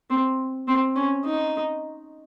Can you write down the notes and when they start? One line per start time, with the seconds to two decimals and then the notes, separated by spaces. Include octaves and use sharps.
0.10 C4
0.68 C4
0.96 C#4
1.25 D#4